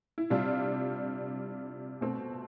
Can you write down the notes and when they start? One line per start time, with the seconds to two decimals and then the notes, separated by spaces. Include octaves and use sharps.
0.18 E4
0.30 C3 G3 D4 F4
2.01 B2 A3 C4